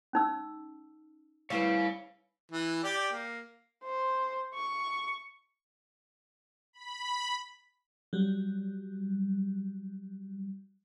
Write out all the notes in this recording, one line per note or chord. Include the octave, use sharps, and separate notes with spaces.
C#4 D#4 E6
G3 E4 B4 C#5 F5
E3
G4 D5 G5
A#3
C5
C#6
B5
F#3 G3